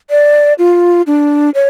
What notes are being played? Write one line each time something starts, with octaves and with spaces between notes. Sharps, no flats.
D5
F4
D4
C#5